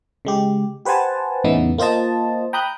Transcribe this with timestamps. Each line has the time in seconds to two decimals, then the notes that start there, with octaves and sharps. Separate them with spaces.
0.25 C#3 G#3 G4
0.85 G4 B4 C5 F#5 G#5 A5
1.44 E2 A2 C#3 E3 B3 D#4
1.78 A#3 F4 C5 D#5 A5
2.53 G5 A#5 B5 D#6 F#6 G6